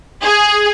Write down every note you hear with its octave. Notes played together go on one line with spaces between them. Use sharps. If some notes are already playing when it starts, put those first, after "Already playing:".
G#4